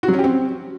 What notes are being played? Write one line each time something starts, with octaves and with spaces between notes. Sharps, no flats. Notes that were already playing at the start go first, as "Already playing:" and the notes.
F#4
F#3
C#4
G4
C4